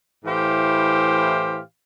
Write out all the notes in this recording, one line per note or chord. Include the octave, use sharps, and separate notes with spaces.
A2 E3 G4 C5 F5